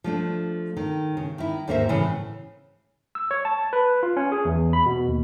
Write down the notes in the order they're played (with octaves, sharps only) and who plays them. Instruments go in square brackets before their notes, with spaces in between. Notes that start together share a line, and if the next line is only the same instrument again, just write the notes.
[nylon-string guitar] F3 A3 D4
D#3
C#3
D#3 E4
D#2 G#2 A#3 A#4 C5 E5
A2 C#3 E3
[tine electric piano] E6
C#5
A5
B4
F4
C#4
G#4
E2
B5
B2
D#2